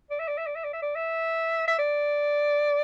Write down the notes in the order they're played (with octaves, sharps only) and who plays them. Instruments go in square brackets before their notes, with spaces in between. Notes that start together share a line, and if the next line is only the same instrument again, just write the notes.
[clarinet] D5
E5
D5
E5
D5
E5
D5
E5
D5
E5
E5
D5